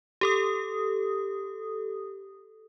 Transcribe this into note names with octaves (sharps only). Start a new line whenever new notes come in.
G4 A4 D#6